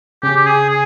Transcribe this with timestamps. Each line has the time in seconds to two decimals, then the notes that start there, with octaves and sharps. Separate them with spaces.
0.23 C#3 C#4 G4
0.36 G4
0.47 G#4
0.70 G#4